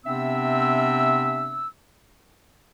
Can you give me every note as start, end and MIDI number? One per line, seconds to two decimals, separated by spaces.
0.05 1.68 48
0.05 1.68 59
0.05 1.68 60
0.05 1.68 62
0.05 1.68 76
0.05 1.68 88